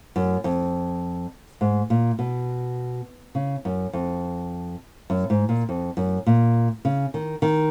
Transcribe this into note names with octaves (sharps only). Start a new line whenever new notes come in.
F#2
F2
G#2
A#2
B2
C#3
F#2
F2
F#2
G#2
A#2
F2
F#2
A#2
C#3
D#3
D#3